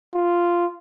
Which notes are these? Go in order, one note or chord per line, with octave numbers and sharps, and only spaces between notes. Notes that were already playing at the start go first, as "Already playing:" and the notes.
F4